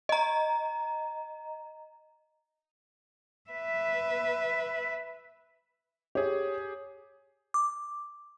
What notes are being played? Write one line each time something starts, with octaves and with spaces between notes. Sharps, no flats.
D#5 A#5
B4 E5
G4 G#4 C#5
D6